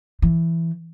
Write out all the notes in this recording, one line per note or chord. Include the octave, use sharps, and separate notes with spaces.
E3